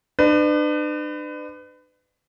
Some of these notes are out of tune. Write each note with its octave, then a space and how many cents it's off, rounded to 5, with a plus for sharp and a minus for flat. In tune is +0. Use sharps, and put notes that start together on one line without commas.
D4 +40 B4 +30